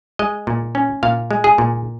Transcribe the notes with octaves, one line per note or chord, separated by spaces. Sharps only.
G#3 D#5
A#2
C#4
A#2 F5
G#3
G#4
A#2